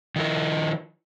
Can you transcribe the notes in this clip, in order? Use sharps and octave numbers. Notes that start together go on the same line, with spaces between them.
D#3 F3 E4 A#4